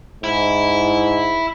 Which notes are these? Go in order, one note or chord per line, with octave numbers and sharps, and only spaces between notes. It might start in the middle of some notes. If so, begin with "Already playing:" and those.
G#2 E4